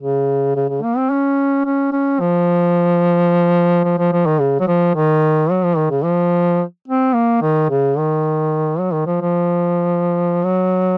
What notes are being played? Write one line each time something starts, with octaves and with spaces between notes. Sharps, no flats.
C#3
C#3
C#3
A#3
C4
C#4
C#4
C#4
F3
F3
F3
F3
D#3
C#3
F#3
F3
D#3
F#3
F3
D#3
C#3
F3
C4
A#3
D#3
C#3
D#3
F#3
D#3
F3
F3
F#3